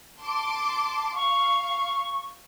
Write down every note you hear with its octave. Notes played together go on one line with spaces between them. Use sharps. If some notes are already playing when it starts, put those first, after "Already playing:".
A5 C6 D6
F5 C#6